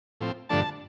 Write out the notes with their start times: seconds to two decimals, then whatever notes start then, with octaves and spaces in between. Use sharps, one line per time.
0.21 A2 F3 C4
0.49 G2 D3 F3 A3 D4 A5